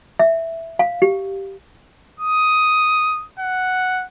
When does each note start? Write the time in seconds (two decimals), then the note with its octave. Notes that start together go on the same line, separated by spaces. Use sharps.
0.19 E5
0.79 F5
1.02 G4
2.20 D#6
3.39 F#5